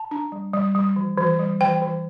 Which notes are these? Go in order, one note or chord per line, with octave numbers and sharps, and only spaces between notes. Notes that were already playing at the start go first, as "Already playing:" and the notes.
Already playing: A5
D4
G3
G3
G3
E3
E3
G3
E3 G5
E3